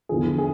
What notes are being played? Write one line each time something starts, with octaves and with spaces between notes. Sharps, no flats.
E2 D3 F3 G#4
G#4